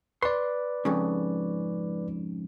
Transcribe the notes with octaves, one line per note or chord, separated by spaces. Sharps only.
B4 D5 C6
F2 G#2 C#3